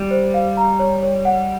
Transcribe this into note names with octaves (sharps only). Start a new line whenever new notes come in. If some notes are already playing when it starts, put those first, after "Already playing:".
Already playing: G3
C5
F5
A#5
C#5
C#5
F#5